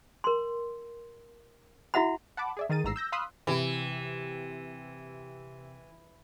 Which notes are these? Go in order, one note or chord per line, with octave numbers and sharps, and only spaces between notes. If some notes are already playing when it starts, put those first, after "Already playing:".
A#4 C6
E4 F#4 E5 F#5 B5
F#5 A5 B5 D6
G#4 D5 E5
D#3 G#4 A#4 A6 D#7
A1 G#2 A#5 E6 C7
E6 G6 A#6
F5 B5 C6 D#6 E6 F#6
C3 E3